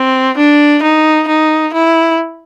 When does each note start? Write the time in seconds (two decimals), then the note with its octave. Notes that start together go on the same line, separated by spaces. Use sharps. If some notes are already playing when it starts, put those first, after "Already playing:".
Already playing: C4
0.37 D4
0.83 D#4
1.28 D#4
1.73 E4